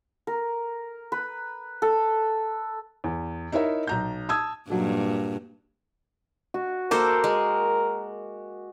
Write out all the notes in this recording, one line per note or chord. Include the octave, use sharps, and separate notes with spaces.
A#4
B4
A4
E2
D#4 E4 A#4 C#5 E5
B1 A#5 G6
A5 D#6 E6 G#6
G2 A#2 F#3 D#4 A4
F#4
A#3 A4 A#4 C5 D6
G#3